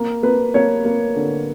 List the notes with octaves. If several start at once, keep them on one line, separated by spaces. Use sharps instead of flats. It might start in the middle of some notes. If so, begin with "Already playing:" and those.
Already playing: A#3
A#3 B4
A#3 C#5
A#3
D3